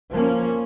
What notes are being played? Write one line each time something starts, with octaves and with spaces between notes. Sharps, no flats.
F3 A#3 C#4